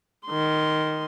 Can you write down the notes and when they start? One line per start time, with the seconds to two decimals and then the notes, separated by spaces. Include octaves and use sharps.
0.27 D#3 C6